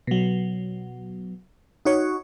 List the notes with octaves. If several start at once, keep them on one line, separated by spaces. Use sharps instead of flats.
B2 F#3
D#4 F#4 C#5